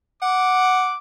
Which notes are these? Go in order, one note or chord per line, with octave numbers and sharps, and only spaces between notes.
F#5 D6